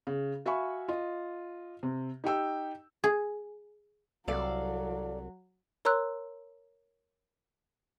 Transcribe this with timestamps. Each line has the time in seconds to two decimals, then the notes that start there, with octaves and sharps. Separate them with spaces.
0.07 C#3
0.46 F#4 E5 F5 G#5 B5 C#6
0.88 F4 D#5
1.83 C3
2.24 D#4 G4 G5 E6
3.04 G#4
4.28 C2 F#3 A4 D5 F5
5.85 A#4 C#5 A#5 C6 E6 F#6